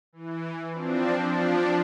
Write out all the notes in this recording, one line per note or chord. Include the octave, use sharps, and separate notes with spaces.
E3
F3 C4 D4
F3 D4